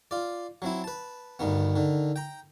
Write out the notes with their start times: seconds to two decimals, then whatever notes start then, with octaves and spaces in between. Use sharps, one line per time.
0.11 F4 D5
0.62 F#3 C4 E4
0.84 B4 A5
1.39 D2 G2 D#3 B3
1.76 D3 D#3
2.16 G5 A#5